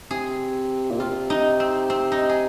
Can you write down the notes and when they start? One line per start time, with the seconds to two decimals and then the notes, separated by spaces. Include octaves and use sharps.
0.11 C3 G#4
0.91 A#2
1.00 C3 F4
1.30 D#4
1.60 C4
1.90 C4
2.12 D#4
2.29 G#4